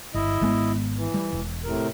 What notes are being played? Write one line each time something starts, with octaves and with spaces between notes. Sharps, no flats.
G1 E4 D#5
G#1 G#3 B3
E3
G3
E1
A2 C3 A#4